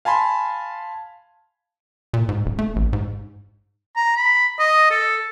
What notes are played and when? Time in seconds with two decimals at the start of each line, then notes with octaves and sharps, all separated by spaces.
0.05 F5 G#5 A5 B5 C6
2.14 A#2
2.29 G#2
2.46 D#1
2.59 A3
2.76 A1
2.93 G#2
3.96 A#5
4.17 B5
4.59 D#5
4.91 A4